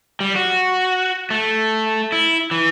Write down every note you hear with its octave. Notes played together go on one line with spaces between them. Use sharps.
G3
F#4
A3
E4
E3